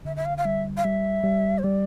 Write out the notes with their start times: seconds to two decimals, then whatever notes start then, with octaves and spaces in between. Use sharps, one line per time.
0.05 D3 E5
0.16 E5
0.25 F5
0.38 F5
0.45 G3 E5
0.77 F5
0.84 G3 E5
1.24 G3
1.58 C5
1.64 G3 D5